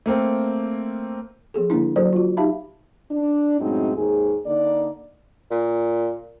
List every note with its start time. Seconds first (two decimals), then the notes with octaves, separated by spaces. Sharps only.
0.06 A3 A#3 C4
1.54 F3 B3 G#4 A4
1.70 D3 G3 A#3 D4 E4
1.96 F#3 F#4 A4 A#4 C5 D5
2.13 F4 F#4
2.37 D#4 G4 E5 F5 A5 B5
3.11 D4
3.60 F#2 A2 G#3 C4 D#4 F#4
3.97 D#2 G#2 D#3 G#4
4.46 D3 A#3 D#4 D5
5.51 A#2